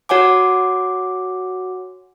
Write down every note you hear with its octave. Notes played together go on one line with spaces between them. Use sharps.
F#4 C#5 F#5 G#5 D6